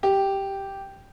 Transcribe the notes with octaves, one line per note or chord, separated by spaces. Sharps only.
G4